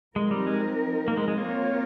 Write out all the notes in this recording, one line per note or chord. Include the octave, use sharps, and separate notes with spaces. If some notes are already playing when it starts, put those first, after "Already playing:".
F3 G#3 C4 D#4 A#4
G3
G#3
A#3
G#3
G#3
A#3 C4 F4 A#4 C#5